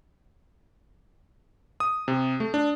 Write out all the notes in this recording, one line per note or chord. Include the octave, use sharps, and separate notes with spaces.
D#6
C3
A3
D4